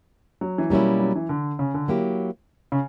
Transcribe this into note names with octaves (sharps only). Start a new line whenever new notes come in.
F#3
E3
B2 F#3 G3 A#3 C#4 E4
F#3
E3
D3
C#3
D3
F#3 A#3 E4 G4
C#3